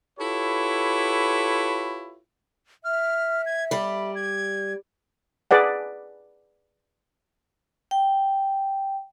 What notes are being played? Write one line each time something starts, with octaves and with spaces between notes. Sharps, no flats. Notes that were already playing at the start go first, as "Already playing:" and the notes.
E4 F4 G4 A4 B4 C#5
E5 F6
G#6
G3 D5 B5
G#6
G#4 B4 D5 F#5
G5